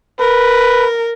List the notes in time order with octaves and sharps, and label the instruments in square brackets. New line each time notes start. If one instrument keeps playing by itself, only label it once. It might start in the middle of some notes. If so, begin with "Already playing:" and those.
[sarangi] A#4 [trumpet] B4